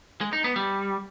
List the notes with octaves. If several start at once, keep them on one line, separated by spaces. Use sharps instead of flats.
G#3
D#4
B3
G3